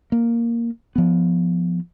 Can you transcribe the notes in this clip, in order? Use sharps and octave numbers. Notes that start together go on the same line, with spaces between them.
A#3
F3 B3